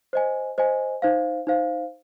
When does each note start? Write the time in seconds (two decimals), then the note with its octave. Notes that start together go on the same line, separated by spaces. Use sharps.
0.13 C5 D#5 G#5
0.58 C5 D#5 G#5
1.02 D#4 C5 F5
1.47 D#4 C5 F5